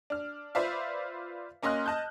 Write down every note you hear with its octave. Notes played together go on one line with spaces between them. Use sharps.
D4 F6
F4 B4 C5 D5 E5 F5
A#3 C#4 D#5 C6 F6 F#6
D#5 A5 F#6 G6